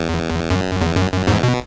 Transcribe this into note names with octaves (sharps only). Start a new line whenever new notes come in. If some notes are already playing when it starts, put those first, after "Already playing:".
Already playing: E2
F#2
E2
F#2
F#2
E2 G#2
B2